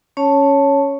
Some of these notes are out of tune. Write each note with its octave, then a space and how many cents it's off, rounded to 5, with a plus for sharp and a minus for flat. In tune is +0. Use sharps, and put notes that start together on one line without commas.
C#4 +0 C#5 +0 A5 +0